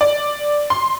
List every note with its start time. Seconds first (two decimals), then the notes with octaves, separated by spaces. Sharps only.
0.01 D5
0.70 C6